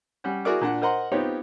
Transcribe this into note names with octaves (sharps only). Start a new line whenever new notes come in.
G3 C#4 F#5
E4 F#4 G#4 A#4 D5 D6
A#2 D4 F#5
A#4 C5 D#5 F#5 A#5 C6
B3 C4 D#4 F4 G4 C#5